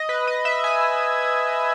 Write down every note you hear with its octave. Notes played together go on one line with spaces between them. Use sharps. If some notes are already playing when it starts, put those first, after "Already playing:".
Already playing: D#5
B4
D#5
E5
G#5